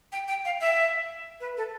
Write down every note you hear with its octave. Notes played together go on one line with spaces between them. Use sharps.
G5
G5
F5
E5
B4
A4